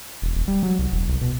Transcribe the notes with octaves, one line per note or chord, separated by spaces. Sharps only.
E1
E1
G3
F#3
C2
E1
C2
B2